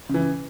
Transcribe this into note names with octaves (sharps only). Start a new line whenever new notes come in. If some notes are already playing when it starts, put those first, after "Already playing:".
C#3 E3